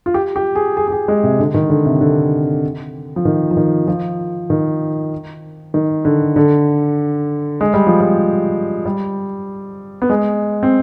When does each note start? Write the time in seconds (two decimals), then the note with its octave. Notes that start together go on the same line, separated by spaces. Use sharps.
0.06 F4
0.14 G4
0.36 G4
0.55 G#4
0.77 G#4
0.88 G#4
0.92 G4
1.08 G#3
1.23 C3
1.39 D3
1.54 D#3
1.70 D3
1.86 C3
2.01 D3
3.16 F3
3.25 D#3
3.51 F3
3.57 D#3
3.88 F3
4.50 D#3
5.74 D#3
6.05 D3
6.36 D3
7.61 G#3
7.74 G3
7.87 F3
8.00 G3
8.85 G3
10.02 B3
10.10 G#3
10.63 C4